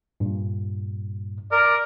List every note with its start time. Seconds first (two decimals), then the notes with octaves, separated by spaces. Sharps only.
0.20 G2 A#2
1.52 A#4 D5